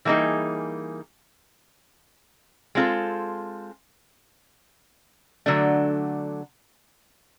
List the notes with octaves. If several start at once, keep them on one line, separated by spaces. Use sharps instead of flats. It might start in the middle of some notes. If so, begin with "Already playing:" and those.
E3 G3 A#3 D#4 G#4
G#3 C4 F4 A4
D3 F#3 A3 D4